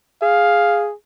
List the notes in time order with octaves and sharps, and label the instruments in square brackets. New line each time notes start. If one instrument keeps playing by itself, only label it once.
[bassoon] G#4 [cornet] F5